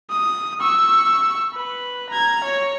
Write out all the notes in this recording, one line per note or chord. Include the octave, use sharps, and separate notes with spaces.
D#6
C#6 E6
B4
A#5 G#6
C#5